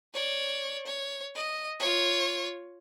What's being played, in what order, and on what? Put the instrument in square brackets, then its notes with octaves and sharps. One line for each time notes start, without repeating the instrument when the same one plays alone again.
[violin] C#5 D5
C#5
D#5
F4 C#5